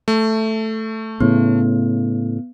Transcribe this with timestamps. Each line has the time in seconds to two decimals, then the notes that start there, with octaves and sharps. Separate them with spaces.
0.08 A3
1.21 A2 C#3 B3